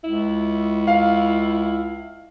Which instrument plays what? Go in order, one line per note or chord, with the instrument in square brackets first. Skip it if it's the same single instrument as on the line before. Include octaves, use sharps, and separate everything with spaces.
[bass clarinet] C#2 [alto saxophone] E4
[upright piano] F5